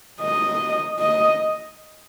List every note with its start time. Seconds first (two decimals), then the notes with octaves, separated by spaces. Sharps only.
0.21 D#5
0.99 D#5